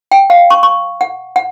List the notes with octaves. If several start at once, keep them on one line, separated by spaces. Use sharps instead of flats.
G5
F5
C#6
C#6
F#5
F#5